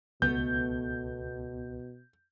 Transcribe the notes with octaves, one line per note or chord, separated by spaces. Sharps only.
C#2 B2 A3 B3 G6